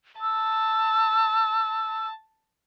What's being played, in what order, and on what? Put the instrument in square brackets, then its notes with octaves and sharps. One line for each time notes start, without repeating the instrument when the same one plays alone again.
[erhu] A5 [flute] E6